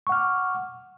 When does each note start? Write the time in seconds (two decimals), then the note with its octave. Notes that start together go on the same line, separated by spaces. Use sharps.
0.07 C#6
0.09 F#5
0.12 F6
0.15 D6